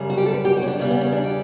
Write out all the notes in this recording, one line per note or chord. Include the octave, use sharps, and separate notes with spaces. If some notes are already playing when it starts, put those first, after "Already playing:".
Already playing: F#2 C#3 G3
F#4
G4
A4
B4
G4
F#4
C#4
D4
E2 C#3 G3 B3
B3
C#4
D4
G4